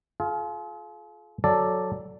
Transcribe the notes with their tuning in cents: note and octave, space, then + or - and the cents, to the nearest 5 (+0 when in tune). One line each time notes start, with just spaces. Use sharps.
F4 +0 G#4 +45
F#3 +0 A4 +0 D5 +0